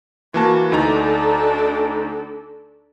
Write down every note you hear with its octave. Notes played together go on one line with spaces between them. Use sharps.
E3 A#3 F#4 A5
D2 D4 D#4 A4 A#5